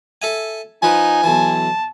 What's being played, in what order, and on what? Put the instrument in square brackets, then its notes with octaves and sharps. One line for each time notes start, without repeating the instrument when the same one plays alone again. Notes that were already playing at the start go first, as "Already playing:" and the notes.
[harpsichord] A4 E5 G#5
[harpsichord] F3 B4 [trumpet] D#4 [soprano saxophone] G#5
[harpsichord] B1 E3 [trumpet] A5